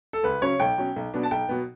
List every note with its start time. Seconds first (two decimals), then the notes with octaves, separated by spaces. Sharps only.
0.13 A4
0.23 C#2 B4
0.42 C#3 F#3 C#4 C#5
0.60 B1 G5
0.78 B2 F#3 C#4
0.96 B1
1.14 B2 F#3 B3 D4
1.23 A5
1.31 B1 G5
1.49 B2 F#3 B3